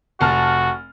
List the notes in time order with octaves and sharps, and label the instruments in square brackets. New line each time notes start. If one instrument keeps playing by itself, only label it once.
[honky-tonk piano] F1 A5 F6 [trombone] F#4